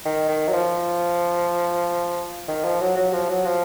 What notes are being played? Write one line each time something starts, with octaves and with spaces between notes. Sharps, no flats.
D#3
D#3
F#3
F3
D#3
F3
F#3
F#3
F3
F#3
F3